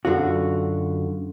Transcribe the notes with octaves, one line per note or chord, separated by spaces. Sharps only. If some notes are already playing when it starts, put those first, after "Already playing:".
F#2 D3 F4 F#4